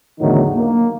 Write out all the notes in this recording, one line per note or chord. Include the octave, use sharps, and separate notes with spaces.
E2 A2 D3 D#3 F#3 D#4
A#3